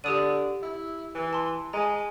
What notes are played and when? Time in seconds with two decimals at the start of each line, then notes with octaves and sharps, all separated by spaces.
0.04 D3 G4 D#6 D#7
0.62 E4
1.15 E3
1.33 A5 C6
1.73 G#3 G#5 A#5